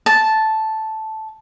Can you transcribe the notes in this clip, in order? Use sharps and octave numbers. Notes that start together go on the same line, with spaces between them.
A5